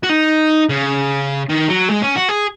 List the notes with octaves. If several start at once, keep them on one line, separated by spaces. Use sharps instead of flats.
F#4
D#4
C#3
D#3
F#3
G#3
C#4
F#4
G#4